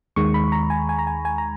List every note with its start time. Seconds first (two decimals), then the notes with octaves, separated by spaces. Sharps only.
0.16 D#2 D#3 G#3 C#6
0.34 B5
0.52 A#5
0.70 G#5
0.89 G#5
0.99 A#5
1.07 G#5
1.25 G#5
1.38 A#5